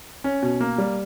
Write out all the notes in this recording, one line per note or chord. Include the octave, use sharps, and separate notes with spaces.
C#4
B2
A#3
G3